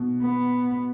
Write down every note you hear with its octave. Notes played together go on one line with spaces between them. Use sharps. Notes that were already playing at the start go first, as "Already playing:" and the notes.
Already playing: B2
B3